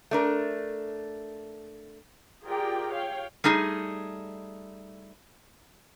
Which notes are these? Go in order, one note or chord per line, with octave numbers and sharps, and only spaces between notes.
A3 D4 A#4
F4 G4 G#4 A#4 D5 G5
C#5 F5 G5
G3 A3 D#4 G#4